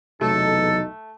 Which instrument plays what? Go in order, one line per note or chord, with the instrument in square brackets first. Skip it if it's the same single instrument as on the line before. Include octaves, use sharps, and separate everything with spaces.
[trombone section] B1 E2 D#4 [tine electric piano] C3 F#3 [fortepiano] A3 [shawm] A4